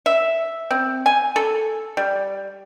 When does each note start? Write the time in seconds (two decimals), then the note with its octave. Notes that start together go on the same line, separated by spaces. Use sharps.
0.06 E5
0.71 C4
1.06 G#5
1.36 A4
1.97 G3